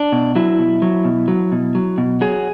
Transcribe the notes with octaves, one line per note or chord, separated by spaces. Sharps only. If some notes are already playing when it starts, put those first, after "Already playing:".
Already playing: D4
B2
F#3 E4
B2
F#3
B2
F#3
B2
F#3
B2
F#3 G#4